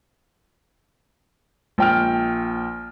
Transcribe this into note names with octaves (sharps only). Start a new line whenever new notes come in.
A#1 G5 F6